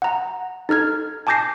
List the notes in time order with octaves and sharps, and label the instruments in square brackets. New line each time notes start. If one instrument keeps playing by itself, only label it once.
[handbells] F#5 A#5
D#4 A4 F6 G#6
G#5 A5 D6 G6 A#6 C7